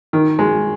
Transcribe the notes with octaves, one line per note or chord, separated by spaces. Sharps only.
D#3
G#3